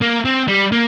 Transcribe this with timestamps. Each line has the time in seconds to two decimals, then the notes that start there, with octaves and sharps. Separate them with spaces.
0.02 A#3
0.25 C4
0.48 G3
0.72 A#3